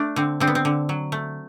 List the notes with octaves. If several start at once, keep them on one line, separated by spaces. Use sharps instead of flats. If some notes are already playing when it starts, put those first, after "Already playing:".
Already playing: A3 D4
D3 C4
D3 C4
B3
C4
D3
F#3
A3